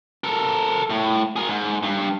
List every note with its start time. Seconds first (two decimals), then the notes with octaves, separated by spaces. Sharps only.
0.24 A4 A#4
0.90 A2
1.36 G#4 A#4
1.48 G#2
1.83 G2